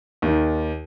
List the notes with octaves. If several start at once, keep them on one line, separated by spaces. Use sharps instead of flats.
D#2 D#3